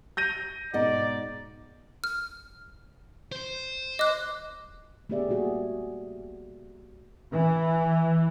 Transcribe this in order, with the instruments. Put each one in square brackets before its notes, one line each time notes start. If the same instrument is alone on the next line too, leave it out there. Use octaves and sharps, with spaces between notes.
[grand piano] G6 A#6 D#7
[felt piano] G#2 B2 A#5 [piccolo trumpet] D5 [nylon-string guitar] D#5 F#5
[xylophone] F6
[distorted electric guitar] C5
[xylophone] D#5 F#6 [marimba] D6
[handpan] A3 B3 G4 G#4 D5 E5
G3 A#3 F#4 G#4
[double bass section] E3